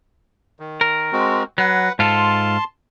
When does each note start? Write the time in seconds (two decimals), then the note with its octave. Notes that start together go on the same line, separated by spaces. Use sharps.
0.60 D#3
0.81 A#4
1.13 G#3 C4 F#4
1.58 F#3 B4 F#5
1.99 G#2 F4 A4 A5 C6